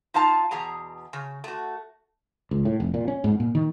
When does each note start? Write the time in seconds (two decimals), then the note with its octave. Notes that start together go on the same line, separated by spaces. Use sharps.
0.14 D#4 F4 F5 A5 A#5
0.51 E2 B2 G#4 A#5
1.13 C#3
1.44 A3 F#4
2.51 C#2
2.65 A2
2.80 F1
2.94 A#2
3.08 C#4
3.24 G#2
3.40 A#2
3.55 D#3